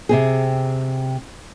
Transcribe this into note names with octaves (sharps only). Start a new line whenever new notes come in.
C3 C4 G#4